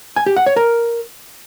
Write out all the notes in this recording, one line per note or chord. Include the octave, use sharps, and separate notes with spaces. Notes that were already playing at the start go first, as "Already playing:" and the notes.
G#5
G4
F#5
C#5
A#4